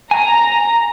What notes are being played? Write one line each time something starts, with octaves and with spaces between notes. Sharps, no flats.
G#5 A#5